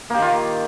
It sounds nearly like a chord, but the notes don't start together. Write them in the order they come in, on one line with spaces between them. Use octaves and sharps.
A#3 G4 D#3 F4